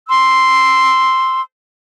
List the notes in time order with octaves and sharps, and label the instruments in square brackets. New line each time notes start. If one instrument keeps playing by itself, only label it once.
[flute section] C6 E6